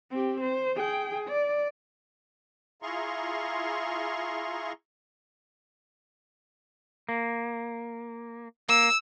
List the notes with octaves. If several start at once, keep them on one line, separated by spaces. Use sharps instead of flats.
C4 G4
C5
G#4 G5
D5
E4 F4 G#4 A#5 C6 C#6
A#3
A#3 E6